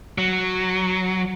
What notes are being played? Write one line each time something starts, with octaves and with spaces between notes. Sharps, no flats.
F#3